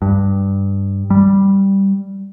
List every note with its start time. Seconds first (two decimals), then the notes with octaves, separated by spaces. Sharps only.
0.02 G2
1.10 G3